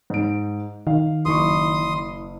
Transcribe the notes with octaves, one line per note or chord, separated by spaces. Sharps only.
G#2 D7
D#3 F5
F#1 E4 C6 C#6 D#6